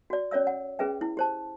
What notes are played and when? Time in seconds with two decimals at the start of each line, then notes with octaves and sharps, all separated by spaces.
0.10 F#4 D5
0.31 C#4 C#5 D5 E5 E6
0.47 F#5
0.79 C#4 G#4 B4 E5 G5
1.01 E4
1.17 G4 C5 A5